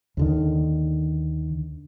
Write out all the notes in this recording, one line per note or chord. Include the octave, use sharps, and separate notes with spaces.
D#2 D3 D#3